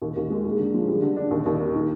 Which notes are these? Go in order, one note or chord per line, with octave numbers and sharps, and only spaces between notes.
D#2
D#2
G#3
A#3
D3
F3
G3
D3
D4
D#2
D#2
A#3
D#3